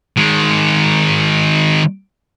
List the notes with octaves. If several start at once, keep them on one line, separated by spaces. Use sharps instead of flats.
D#3 G#3